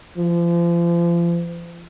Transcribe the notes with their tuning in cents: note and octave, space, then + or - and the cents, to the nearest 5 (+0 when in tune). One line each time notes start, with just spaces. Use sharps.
F3 -35